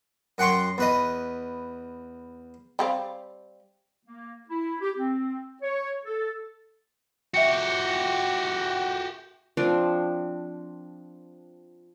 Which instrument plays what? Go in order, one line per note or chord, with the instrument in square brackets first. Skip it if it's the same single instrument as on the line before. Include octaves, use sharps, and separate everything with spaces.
[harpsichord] F#2 F#5 G5 C6 C#6
E2 B4 D#5
[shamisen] G3 C4 F5
[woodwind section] A#3
E4
G4
C4
C#5
A4
[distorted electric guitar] F#4 G4 [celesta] E5 C#7
[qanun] F3 C4 D4